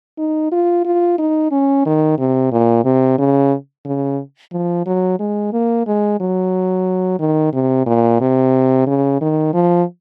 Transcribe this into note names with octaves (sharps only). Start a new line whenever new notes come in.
D#4
F4
F4
D#4
C#4
D#3
C3
A#2
C3
C#3
C#3
F3
F#3
G#3
A#3
G#3
F#3
D#3
C3
A#2
C3
C#3
D#3
F3